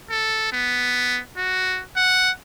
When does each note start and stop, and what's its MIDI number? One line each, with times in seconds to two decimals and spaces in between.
0.11 0.49 69
0.52 1.20 59
1.37 1.83 66
1.97 2.31 78